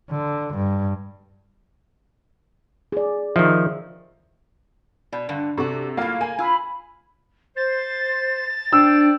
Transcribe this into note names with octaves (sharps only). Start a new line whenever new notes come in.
D3
G2
G#4 D5
D#3 F3 E5
B2 D5
G2 D3
C3 D4 F#4 A4 C#6
A2 F#3 A#3 F4 F5
A#3 G#5
F4 B5 E6 G#6
C5 A6
D4 C5 D5 G5 E6